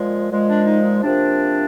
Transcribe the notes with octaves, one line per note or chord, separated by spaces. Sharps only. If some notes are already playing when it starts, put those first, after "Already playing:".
Already playing: A#2 F3 G#3
A#2 F3 G#3
D4
D#4
D#4
C3 F3 A#3 D4